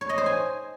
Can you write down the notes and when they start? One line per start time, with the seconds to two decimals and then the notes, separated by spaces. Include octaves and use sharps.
0.01 C#5
0.09 D#5
0.18 C5
0.26 G#5